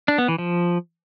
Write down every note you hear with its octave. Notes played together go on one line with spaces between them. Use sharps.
D4
B3
E3
F3